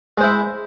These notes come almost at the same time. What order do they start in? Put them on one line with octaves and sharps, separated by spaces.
G#3 C5 E4